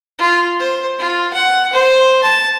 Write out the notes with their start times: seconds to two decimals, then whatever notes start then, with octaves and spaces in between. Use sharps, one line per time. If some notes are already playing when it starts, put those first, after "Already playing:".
0.18 F4
0.59 C5
0.98 F4
1.33 F#5
1.72 C5
2.23 A5